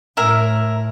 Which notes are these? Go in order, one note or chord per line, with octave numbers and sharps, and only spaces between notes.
A2 E4 A#4